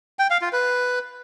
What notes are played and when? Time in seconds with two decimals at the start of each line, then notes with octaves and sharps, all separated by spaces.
0.19 G5
0.30 F5
0.41 F4
0.53 B4